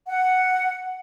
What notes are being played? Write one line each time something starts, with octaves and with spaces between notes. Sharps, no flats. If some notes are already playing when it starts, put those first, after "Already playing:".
F#5